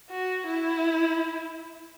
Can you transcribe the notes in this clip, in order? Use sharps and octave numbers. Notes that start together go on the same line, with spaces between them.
F#4
E4